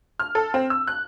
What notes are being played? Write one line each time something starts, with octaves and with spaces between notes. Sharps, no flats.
F6
A4
C4
E6
F#6